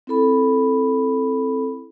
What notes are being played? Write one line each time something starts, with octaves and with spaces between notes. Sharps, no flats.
C4 E4 A4 B5